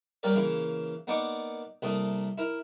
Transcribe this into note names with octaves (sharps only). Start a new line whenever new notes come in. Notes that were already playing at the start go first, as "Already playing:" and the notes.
G3 A#3 G4 A#4 C#5 D5
C#3 E3 A#3
A#3 B3 D#4 D5 C#6 D6
C2 A3 A#3 D#6
E4 A#4